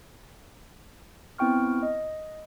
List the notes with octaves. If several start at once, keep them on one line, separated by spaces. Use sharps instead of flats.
B3 C4 E4 G5 C#6 F6
D#5